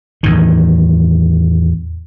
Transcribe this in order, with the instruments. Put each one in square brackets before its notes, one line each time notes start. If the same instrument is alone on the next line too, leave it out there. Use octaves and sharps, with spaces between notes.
[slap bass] E2 A2 D#3